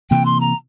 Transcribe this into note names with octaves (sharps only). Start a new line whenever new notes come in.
C3 E3 A#3 G5
C6
A#5